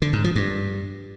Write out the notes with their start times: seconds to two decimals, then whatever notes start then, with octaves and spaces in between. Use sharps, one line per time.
0.02 D3
0.13 G#2
0.24 F3
0.36 G2